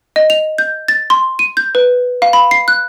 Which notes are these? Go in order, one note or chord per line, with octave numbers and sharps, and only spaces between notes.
D#5
F7
G6
A6
C6
D#7
G6
B4
F5
B5
C7
F#6